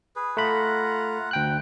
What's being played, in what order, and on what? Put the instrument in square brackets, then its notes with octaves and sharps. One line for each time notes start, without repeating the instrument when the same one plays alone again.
[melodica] G#4 B4
[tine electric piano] A3 B5 [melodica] F4 F#5 A#5
[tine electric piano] D2 G5 F#6